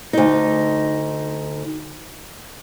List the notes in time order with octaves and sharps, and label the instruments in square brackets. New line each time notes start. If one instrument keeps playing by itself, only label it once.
[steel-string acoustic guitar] D2 D#4